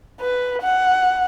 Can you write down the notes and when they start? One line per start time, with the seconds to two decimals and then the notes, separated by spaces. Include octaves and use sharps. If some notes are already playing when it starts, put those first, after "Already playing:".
0.21 B4
0.62 F#5